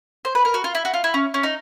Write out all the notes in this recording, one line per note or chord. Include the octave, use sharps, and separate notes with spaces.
C5
B4
A#4
F#4
F4
E4
F#4
F4
E4
C#4
C#4
D#4